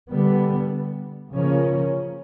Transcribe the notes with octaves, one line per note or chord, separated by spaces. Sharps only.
D3 G3 B3
C#3 F3 A#3 C#4